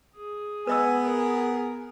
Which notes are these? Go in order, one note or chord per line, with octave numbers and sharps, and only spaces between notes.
G#4
B3 B4 D#5 G#5 E6
G#4 A#4